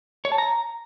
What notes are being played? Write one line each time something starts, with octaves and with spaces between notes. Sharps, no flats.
C#5
A5
A#5